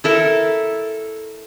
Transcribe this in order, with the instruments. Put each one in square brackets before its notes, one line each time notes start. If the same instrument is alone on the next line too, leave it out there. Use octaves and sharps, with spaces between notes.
[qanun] E4 A4 A#4